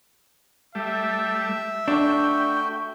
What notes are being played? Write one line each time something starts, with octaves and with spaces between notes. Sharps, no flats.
G3 A3 E5
A3 D4 F#4 G5